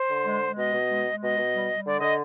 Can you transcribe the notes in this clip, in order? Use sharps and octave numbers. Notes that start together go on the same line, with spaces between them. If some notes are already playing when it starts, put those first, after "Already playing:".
Already playing: C5
D3
G#3
G#3
B2 D#5
B2
G#3
G#3
B2 D#5
B2
G3
G3
D3 D5
D3 D#5